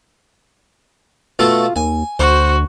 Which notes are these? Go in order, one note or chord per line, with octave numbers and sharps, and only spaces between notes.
B2 A3 F4 A4
D#2 G#5
D2 F#4 C5